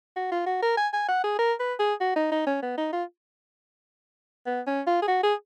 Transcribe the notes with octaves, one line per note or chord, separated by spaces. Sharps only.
F#4
F4
F#4
A#4
G#5
G#5
F#5
G#4
A#4
B4
G#4
F#4
D#4
D#4
C#4
B3
D#4
F4
B3
C#4
F4
G#4
F#4
G#4